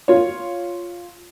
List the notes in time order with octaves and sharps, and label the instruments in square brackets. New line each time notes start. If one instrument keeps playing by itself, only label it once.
[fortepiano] F4 C#5